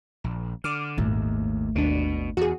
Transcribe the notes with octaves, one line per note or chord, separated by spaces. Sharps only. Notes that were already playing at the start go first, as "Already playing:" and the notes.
A#1
D3 D6 F6
G#1 D#2 A#2 A3
D#2 B2 D4
E2 F#4 G#4